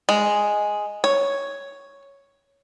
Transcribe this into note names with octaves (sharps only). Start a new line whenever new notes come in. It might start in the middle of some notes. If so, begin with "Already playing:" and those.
G#3
C#5